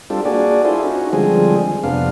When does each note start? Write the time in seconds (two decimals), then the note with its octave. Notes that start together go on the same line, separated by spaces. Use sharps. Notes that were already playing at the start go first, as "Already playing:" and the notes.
0.10 G3 C4 D4 F4 G4 A4
0.25 A#3 D4 F#4 G#4 D5
0.65 E4 F4 G#4 A4 C5
0.83 C#4 D#4 F#4
1.13 D3 F3 G3 G#3 C4 G#4
1.84 F2 C3 B3 D4 F5